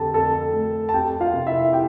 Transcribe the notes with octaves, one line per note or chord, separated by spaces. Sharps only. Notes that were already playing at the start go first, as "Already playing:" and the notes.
Already playing: F2 D3 G4 A4 A5
F2 A4 A5
A3
A5
F2 G4 G5
F4 F5
C3
E4 E5
G4 G5